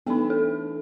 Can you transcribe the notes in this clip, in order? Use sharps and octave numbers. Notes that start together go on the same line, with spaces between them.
E3 A3 B3 D4 D#4
A4